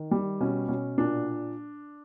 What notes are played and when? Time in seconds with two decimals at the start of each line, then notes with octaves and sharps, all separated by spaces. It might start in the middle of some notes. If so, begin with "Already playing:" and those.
Already playing: D#3
0.11 G3
0.40 B2 C#4
0.69 B2 C#4
0.98 A#2 D4